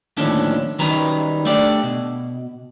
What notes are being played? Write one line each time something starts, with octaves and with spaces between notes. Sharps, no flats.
D#2 A2 D3 F3 C#4 D4
D#3 F#3 G3 C#4 B4 A#5
A3 D4 G4 D5
B2